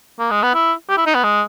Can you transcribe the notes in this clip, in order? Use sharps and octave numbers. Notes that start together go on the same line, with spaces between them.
A#3
G#3
B3
E4
G4
E4
D#4
B3
G#3